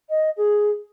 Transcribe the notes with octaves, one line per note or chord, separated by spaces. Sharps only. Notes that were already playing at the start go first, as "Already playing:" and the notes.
D#5
G#4